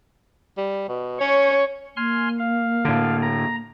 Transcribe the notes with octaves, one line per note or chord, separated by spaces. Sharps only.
G3
B2
C#4 C#5
A#3 G#5 C6 F6
F5
A2 D3
A#5